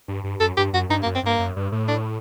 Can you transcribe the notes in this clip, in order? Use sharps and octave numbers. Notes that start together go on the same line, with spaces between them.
G2
G2
F#2 A4
G2 G4
F#2 F#4
G2 D#4
A#3
F#2
C4
G2 A#3
F#2
G2
A2
D4